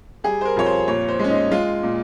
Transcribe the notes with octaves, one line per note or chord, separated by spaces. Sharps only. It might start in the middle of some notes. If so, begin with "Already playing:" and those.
G3 G#4
C5
A#4
F2 C#5
C5
A#2 C#5
C5
G#3 C#4
D#4
G#3 F4
A#2